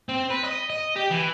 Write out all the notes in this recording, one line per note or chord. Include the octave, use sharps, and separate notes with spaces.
C4
B4
D#5
D#5
G4
E3